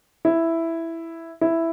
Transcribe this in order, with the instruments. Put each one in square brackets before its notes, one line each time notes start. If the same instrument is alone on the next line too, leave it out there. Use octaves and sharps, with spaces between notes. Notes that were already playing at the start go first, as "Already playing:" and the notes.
[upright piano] E4
E4